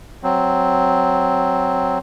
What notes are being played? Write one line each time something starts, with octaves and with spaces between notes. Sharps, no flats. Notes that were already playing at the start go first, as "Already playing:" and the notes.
F#3 C4